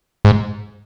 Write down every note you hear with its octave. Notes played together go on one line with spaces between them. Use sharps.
G#2